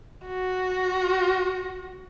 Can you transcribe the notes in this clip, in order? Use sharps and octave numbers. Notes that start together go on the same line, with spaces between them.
F#4